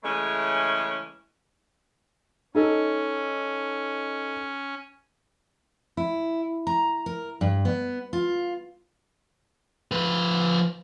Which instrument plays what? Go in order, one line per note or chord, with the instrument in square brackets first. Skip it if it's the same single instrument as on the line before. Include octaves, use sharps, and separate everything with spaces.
[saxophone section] C#3 E3 G#3 A3 C#4
[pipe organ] C#4 [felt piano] D#4 A4
[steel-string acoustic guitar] E4
A#5
A#4
G2
B3
F4
[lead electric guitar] F3 B4